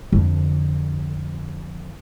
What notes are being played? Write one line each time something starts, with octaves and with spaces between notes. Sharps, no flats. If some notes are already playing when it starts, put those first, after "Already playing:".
F2 D3